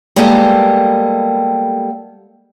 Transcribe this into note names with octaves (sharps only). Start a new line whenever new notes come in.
G3 G#3 A#3 B3 G4 A4